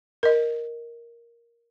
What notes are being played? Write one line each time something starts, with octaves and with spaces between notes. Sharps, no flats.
A#4 D#5